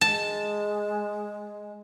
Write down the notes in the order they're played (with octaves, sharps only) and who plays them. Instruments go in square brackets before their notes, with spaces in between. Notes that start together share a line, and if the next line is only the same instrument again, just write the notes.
[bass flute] G#3 [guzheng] A5